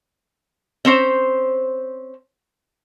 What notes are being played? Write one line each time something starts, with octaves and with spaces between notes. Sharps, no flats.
C4 C#4 C5